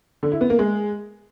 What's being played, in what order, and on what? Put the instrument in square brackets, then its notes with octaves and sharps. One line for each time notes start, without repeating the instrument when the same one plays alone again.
[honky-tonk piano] D3
E4
B3
A#3
G#3